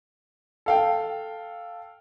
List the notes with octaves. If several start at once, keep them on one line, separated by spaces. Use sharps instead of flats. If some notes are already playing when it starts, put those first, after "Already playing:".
A4 F5 G5